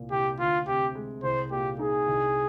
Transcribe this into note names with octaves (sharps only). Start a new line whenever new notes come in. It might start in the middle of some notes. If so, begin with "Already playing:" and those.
Already playing: C2 A#2
C2 G4
D2 F4
C3 G4
G#3
C2 C5
A#2 G4
D#4 G#4
C2